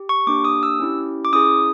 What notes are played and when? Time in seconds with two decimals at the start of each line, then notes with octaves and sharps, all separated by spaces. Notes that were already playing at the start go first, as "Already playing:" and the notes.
Already playing: G4
0.09 C#6
0.27 A#3 D4 G4 D6
0.45 D#6
0.63 E6
0.80 C#4 E4 G4
1.25 D6
1.33 C#4 E4 G#4 D#6